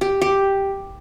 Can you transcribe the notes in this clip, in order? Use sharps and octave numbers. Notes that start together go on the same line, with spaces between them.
G4
G4